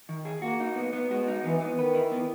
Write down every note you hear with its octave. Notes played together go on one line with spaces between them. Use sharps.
D#3
G#4
A#3 F#4
D#4
B3
B3
G#3 F#4
D#4
E3 B3
B3
D#3 B4
E4
B3